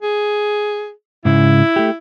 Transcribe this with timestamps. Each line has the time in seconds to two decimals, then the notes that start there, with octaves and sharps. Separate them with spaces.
0.02 G#4
1.25 G#2 C#3 E4
1.76 A3 G4